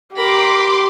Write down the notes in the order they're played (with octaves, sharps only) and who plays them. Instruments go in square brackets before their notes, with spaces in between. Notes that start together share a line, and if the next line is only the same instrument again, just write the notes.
[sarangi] G4 [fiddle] A#4 B5 [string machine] C6 D6